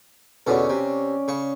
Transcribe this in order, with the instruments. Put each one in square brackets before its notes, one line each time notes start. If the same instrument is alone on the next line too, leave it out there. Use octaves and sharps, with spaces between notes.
[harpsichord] E2 B2 D3 [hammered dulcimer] C#4 C#5 D5
[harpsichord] C3
C#3 C#6